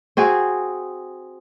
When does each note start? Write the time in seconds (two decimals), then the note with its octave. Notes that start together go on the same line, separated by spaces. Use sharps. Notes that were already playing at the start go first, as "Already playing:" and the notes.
0.17 C4 F#4 G#4